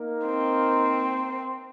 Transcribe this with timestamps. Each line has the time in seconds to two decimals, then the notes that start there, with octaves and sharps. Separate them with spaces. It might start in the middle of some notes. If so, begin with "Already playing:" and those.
Already playing: A#3 D#4 A#4
0.25 C4